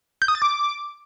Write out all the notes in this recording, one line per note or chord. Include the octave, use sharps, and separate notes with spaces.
G6
D#6
A6
D6